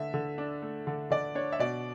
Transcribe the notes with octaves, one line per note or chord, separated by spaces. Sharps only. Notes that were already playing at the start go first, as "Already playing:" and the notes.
Already playing: D3 A3 E5
D3
D4
A3
D3
D3 D5
D4 C#5
E5
B2 D5